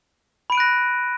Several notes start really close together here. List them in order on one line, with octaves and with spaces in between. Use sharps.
B5 D7 D#7 F#6 A#6